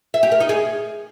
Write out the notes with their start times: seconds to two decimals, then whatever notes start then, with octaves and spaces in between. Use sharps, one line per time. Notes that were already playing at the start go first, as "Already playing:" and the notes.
0.14 E5
0.23 G4
0.32 A#4
0.40 D#4
0.49 G#4